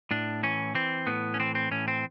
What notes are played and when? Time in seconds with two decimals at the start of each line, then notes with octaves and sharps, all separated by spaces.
0.11 A2 D4
0.43 E3 C#4
0.75 E3 C4
1.07 A2 B3
1.34 C#4
1.40 E3 C4
1.55 C4
1.71 A2 C#4
1.88 C4